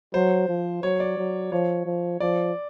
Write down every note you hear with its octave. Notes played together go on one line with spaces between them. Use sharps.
F#3 C5
F3
F#3 C#5
D5
F#3
F3 C#5
F3
F3 D5